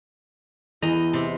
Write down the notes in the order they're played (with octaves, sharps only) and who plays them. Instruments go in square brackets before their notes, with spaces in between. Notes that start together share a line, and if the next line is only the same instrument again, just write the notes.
[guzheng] E2 D#5 A#5 [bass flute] E4
[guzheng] C3